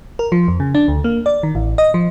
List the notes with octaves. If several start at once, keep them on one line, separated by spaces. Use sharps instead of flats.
A#4
F3
F2
C#3
D4
D2
A#3
D5
D#3
A1
D#5
F3